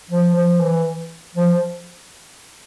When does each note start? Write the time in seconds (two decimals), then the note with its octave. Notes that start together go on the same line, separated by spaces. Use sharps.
0.10 F3
0.35 F3
0.60 E3
1.35 F3